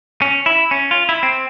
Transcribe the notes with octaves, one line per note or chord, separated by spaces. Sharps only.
C#4
E4
C#4
F4
E4
C4